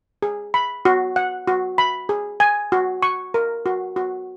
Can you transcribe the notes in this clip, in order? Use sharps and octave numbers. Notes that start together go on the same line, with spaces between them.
G#4
B5
F#4
F#5
F#4
B5
G#4
G#5
F#4
C#6
A#4
F#4
F#4